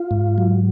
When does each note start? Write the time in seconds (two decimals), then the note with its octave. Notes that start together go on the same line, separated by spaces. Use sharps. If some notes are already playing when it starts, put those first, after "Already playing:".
Already playing: F4
0.11 G#2
0.38 F#3